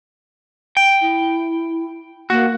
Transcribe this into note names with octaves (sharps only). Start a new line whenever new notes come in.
G5
E4
A#3 F#4